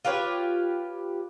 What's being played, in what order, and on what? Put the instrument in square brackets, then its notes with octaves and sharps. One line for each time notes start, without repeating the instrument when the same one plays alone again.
[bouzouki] F4 G4 B4 C#5